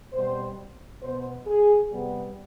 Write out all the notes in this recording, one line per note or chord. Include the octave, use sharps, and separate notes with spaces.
B2 G3 C4 C5
B2 B3 C5
G#4
C3 G3 B3